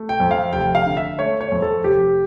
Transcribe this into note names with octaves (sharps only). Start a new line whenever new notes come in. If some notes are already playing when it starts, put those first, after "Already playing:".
Already playing: A3
G5
F2
F5
F1 G5
F5
D3
E5
A3 C#5
C#5
F2
A4
F1 G4